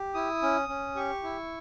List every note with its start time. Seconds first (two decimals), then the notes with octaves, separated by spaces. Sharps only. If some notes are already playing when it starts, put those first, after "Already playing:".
Already playing: G4
0.14 E4 D#6
0.42 C#4
0.69 C#4
0.95 G4 C#6
1.23 E4